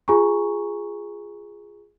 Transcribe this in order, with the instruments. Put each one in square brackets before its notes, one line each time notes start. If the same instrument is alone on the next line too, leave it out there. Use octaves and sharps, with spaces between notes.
[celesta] F4 G#4 G#5 A#5 C#6